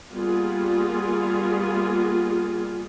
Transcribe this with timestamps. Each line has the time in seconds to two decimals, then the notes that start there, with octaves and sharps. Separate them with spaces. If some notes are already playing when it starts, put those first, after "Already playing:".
0.13 G3 A#3 B3 F4 G#4